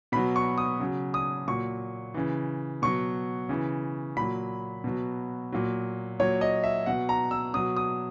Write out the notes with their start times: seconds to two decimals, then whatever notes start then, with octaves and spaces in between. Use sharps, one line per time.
0.12 B2 F#3 B5
0.36 C#6
0.58 D#6
0.80 C#3 F#3
1.14 D#6
1.47 A#2 F#3 C#6
2.14 C#3 E3
2.82 B2 F#3 C#6
3.49 C#3 E3
4.17 A#2 F#3 B5
4.84 B2 F#3
5.52 A#2 F#3
6.19 A#2 F#3 C#5
6.41 D#5
6.64 E5
6.86 B2 F#3 F#5
7.09 A#5
7.31 E6
7.54 B2 F#3 D#6
7.77 D#6